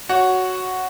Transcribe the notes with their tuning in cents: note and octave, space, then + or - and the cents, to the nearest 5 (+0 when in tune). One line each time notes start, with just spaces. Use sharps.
F#4 +0 C#5 +0 F#5 +0